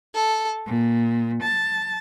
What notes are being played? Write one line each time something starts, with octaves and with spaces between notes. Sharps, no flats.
A4
A#2
A5